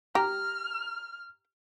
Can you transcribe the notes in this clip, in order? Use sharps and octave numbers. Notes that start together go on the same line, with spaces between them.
G4 A#5 F6